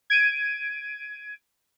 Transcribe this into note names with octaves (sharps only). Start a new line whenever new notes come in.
G#6 D7 D#7